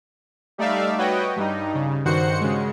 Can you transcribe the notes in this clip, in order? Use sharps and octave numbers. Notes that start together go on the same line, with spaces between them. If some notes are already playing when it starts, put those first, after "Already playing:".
G3 A3 D#4 D5 E5 F5
F#4 B4 C#5 D#5 G5
G2 G3 D#4
C#3
G2 D#3 F#4 C5 F#5 C#7
C#3 G#3